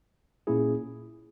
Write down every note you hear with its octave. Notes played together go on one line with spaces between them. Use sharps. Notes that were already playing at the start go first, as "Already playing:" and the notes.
A#2 A#3 C#4 E4 G#4